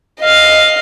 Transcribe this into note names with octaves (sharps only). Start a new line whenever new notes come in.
D#5 F5